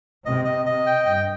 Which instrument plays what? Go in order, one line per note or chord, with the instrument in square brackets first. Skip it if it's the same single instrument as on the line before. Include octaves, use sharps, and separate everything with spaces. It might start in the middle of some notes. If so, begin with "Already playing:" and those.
[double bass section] C3 [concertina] D#5
[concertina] D#5
[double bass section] C3 [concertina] D#5
[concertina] G5
[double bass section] G2 [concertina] G5